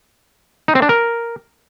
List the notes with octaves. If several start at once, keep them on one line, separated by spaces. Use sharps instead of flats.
D#4
C4
D4
A#4